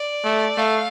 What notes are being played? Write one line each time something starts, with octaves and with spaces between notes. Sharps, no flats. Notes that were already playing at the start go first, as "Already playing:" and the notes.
Already playing: D5
A3
A3 F5